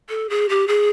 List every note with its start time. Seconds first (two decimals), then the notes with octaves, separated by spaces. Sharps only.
0.09 A4
0.30 G#4
0.49 G4
0.68 G#4